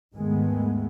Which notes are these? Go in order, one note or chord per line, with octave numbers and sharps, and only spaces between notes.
D#2 G#2 D#3 G#3 A3 B3